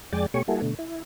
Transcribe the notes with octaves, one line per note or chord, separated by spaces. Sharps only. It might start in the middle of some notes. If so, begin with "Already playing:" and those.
F2 G#3 D5 G5 G#5 A6
B2 A3 G4 C#5 G#5 C#6
G3 A#3 E4 F#4 G#4 A4
B2 D3 A3
E4